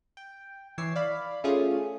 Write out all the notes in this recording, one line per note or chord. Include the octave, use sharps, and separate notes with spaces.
G5
E3 C#5 D6 E6 C7
D5 F5 B5
A3 C#4 F4 G#4